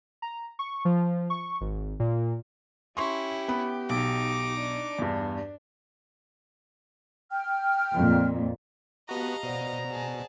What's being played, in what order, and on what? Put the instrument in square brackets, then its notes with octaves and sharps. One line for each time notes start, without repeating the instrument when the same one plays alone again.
[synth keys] A#5
C#6
F3
C#6
G#1
A#2
[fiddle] C#4 E4 [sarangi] G4 [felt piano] C6 C#6
[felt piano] B3 B5
[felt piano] B1 [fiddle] D#4 D6
[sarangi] D4
[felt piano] E2 G2
[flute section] G5 F6
[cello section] F2 A#2
[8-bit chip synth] B3 F#4 [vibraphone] G4 A5 [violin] D#5 F5 [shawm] A#5
[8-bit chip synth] B2 [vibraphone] C5 D5 F#5
[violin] G#4 A5